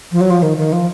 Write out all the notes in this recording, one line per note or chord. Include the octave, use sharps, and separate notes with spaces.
F3
F#3
F3
D#3
D#3
F3